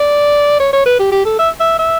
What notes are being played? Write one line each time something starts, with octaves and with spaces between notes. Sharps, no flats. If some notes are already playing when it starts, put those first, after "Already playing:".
Already playing: D5
C#5
C#5
B4
G4
G4
A4
E5
E5
E5